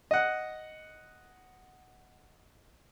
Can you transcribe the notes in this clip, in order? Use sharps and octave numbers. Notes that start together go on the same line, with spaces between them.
D#5 F#5